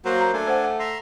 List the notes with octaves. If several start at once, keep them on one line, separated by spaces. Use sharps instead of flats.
F#3 A#3 F#4 C5
A#5
A3 D4 G#5
C5 F#5
F#5
E5 A#5 C6